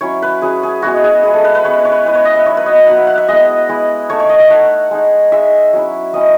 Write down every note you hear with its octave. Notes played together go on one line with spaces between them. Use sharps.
F#3 C#4 E4 C#5
B4
F#3 C#4 E4 G#4
G#4
G#3 B3 E4 F#4
G#4
G#3 B3 E4 G#4
A4
B4
B4
G#3 B3 E4 C#5
B4
C#5
B4
G#3 B3 E4 B4
C#5
D#5
E5
F#3 B3 D#4 C#5
B4
D#5
F#3 B3 D#4 F#5
E5
F#5
E5
G#3 B3 E4 D#5
G#3 B3 E4
A3 D#4 C#5
C#5
D#5
E5
A3 D#4 F#5
G#3 D#4
G#3 D#4 E5
F#3 C#4 E4
F#3 C#4 E4 D#5